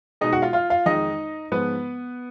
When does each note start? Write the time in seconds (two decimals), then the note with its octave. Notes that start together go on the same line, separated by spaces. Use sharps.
0.21 B2 G#3 D#4 D#5
0.33 F#4 F#5
0.42 F4 F5
0.53 F4 F5
0.70 F4 F5
0.86 F2 D#3 G#3 D#4 D#5
1.52 G#2 F3 G#3 B3 B4